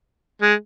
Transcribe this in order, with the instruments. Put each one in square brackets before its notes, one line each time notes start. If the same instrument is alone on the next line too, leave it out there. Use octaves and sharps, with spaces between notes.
[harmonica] G#3